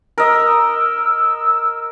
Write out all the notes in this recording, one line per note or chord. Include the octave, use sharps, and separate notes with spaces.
A#4 D#5 E6